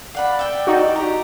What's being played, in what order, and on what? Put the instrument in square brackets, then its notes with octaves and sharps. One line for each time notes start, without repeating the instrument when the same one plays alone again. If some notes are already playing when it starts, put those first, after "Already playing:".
[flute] D5 [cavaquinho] F5 F#5 B5
[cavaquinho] E5 G5
[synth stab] D#4 F#4
[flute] G4 [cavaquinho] A#5